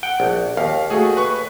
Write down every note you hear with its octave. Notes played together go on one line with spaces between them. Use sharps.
F#5 G5
A#1
D#2 F5
A3 F#4 G#4
B4 C#6